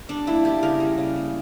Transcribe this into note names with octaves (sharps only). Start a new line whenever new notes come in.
G3 D4
A#3 E4
A#3 G4
C#3 A#4
G3
C#3
A#3